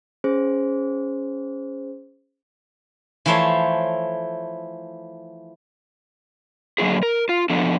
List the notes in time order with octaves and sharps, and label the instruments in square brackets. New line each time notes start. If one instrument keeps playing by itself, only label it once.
[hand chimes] C#4 G#4 C5
[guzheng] E3 F3 A3 E4 C5 C#5
[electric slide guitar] D3 F#3 A#3 E4 G#4
A#4
F4
F3 B3 D4 A4